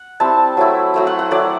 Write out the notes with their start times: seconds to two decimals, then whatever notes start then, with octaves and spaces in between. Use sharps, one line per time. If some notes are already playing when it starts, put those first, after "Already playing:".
Already playing: F#5
0.20 G3 C4 E4 A5
0.57 F#3 A3 E4
0.94 F#3 A3 E4
1.07 F#5
1.19 F#5
1.31 F#3 A3 E4 D5